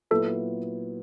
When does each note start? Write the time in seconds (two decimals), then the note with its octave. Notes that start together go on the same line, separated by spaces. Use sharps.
0.11 A#2 F#3 B3 E4 A4